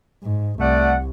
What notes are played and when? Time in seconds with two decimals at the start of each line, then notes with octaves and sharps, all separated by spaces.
0.23 G#2
0.59 C2 A3 D5 F#5